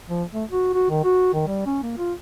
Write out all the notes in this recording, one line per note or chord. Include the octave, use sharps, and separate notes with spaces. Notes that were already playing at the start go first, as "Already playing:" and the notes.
F3
A3
F#4
F#4
D#3
F#4
D#3
G3
C#4
A#3
F4